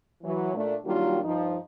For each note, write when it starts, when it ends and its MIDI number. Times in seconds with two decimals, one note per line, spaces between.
0.23 0.53 52
0.23 0.53 54
0.55 0.73 46
0.55 0.73 57
0.55 0.73 62
0.84 1.19 51
0.84 1.19 54
0.84 1.19 55
0.84 1.19 58
0.84 1.19 62
0.84 1.19 65
1.23 1.55 43
1.23 1.55 53
1.23 1.55 63